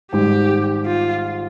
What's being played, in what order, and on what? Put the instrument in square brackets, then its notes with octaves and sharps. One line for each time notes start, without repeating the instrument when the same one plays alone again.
[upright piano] G#1 G#2 G3 [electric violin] G4
[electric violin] F4